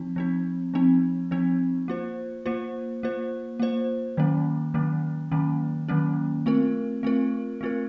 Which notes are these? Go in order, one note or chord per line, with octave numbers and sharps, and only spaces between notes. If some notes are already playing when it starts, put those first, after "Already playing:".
Already playing: F3 C4 D#4
F3 C4 D#4
F3 C4 D#4
F3 C4 D#4
A#3 F4 C5
A#3 F4 C5
A#3 F4 C5
A#3 F4 C5
D#3 F#3 A#3 C#4
D#3 F#3 A#3 C#4
D#3 F#3 A#3 C#4
D#3 F#3 A#3 C#4
A3 C4 F4 A#4
A3 C4 F4 A#4
A3 C4 F4 A#4